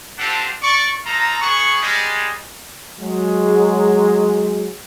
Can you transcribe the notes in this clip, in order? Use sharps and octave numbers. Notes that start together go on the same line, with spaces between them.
C4 D4 F4 G4 A4 F#5
D5 C#6
D#4 F4 A4 A#5
B3 G#4 F#5 C#6
G3 G#3
F#3 G#3